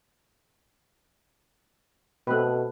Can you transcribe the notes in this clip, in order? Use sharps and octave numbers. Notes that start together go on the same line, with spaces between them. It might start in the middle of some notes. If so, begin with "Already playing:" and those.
B2 A3 C4 B4